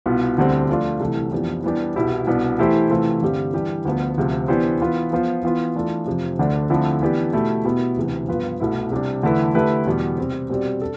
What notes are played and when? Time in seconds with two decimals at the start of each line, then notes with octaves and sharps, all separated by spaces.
0.06 C2 B2 B3 F4
0.38 D2 D3 G3 C4
0.69 F3 A3 D4 F4
1.00 C2 C3 E3 A3
1.32 F2 E3 B3 D4 G4
1.64 E3 G3 B3 D4 G4
1.96 C2 B2 B3 E4 G4
2.27 C2 B2 B3 D4
2.59 E3 A3 E4 G4 C5
2.90 C3 E3 A3 C4 F4
3.22 G2 D3 G3 C4 G4
3.53 E3 G3 D4 G4
3.85 D2 D3 F3 B3
4.17 D2 C3 F3
4.48 E3 B3 D4 G4 C5
4.81 E3 B3 F4 B4
5.11 F3 B3 F4 C5
5.43 E3 B3 F4
5.75 E3 A3 D4 F4 A4
6.06 F2 C3 F3
6.39 D2 D3 A3 D4
6.70 D3 F3 A3 C4 E4
7.02 E3 B3 D4 G4
7.33 B2 A3 E4 G4
7.64 B2 B3 E4 G4
7.97 D2 C3 E3
8.28 G2 F3 B3 F4 B4
8.60 C2 B2 A3 E4
8.92 C3 G3 D4
9.23 E2 D3 A3 E4 B4
9.55 D3 A3 E4 G4 B4
9.86 E2 B2 G3 B3
10.18 C3 G3 C4
10.50 B2 G3 C4 G4 D5
10.81 D4 A4